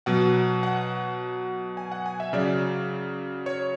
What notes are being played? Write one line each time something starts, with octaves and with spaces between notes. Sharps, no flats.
B2 F#3 F#5
F#5
G#5
F#5
G#5
E5
C#3 F#3 D5
C#5